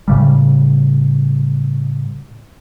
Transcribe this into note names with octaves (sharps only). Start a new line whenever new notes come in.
A2 C#3 G3